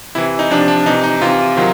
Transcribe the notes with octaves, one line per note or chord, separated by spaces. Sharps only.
C3 E3 E4
D#4
C3 F3 D4
D4
C3 E3 D#4
D#4
C3 E3 F4
C3 D#3 F#3 F4